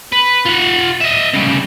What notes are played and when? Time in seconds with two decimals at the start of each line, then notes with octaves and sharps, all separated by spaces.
0.12 B4
0.45 F4 F#5
1.01 D#5 E5
1.33 C#3 G3